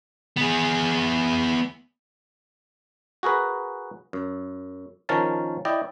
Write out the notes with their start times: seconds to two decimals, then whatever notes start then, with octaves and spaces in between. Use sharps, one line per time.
0.37 B3 G#4
3.23 F#4 G#4 A#4 B4
4.13 F#2
5.09 D#3 F3 C#4 A#4 F5 A5
5.65 E4 D5 D#5 G5